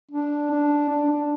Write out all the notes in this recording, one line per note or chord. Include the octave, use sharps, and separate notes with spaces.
D4
D4
D4
D4